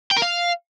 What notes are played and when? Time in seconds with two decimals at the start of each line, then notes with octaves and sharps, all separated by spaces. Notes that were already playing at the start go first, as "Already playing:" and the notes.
0.11 G5
0.17 A#4
0.22 F5